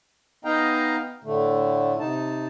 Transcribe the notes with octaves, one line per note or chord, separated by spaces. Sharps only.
B3 D#4 D#5 F5 G5 A#5
A2 D3 A3
C3 D#4 A5